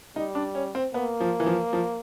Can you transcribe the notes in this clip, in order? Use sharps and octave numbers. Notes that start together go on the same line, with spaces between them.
G3 D#4
D4
C#4
C4
A#3 B3
F3
E3
F3
F3